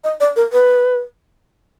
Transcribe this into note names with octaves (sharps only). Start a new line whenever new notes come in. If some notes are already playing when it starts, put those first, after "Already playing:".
D#5
D5
A#4
B4